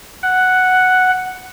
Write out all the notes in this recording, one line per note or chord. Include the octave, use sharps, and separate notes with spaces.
F#5